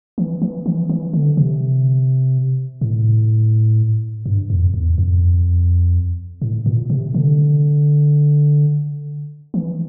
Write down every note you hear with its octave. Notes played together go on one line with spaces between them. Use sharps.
E3
E3
E3
E3
D3
C3
A2
G2
F2
E2
F2
A2
A#2
C3
D3
E3